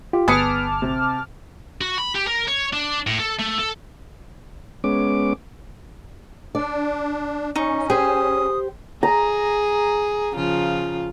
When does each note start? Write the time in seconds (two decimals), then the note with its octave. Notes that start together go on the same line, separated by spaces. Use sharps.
0.13 F4 G4
0.28 G1 B3 G#4 B4 A5 D6 F6 C#7
0.82 C3
1.81 F#4
1.98 B5
2.15 G4
2.27 A#4
2.48 C#5
2.73 D4
3.07 A2
3.20 A4
3.39 A3
3.59 A4
4.84 G#3 B3 C#4 D6
6.55 D4 D5
7.56 C#4 D#4 C#6
7.90 G4 G#4 C5 G#5 D#6
9.03 G#4 A#5
10.32 C#3 F3 F4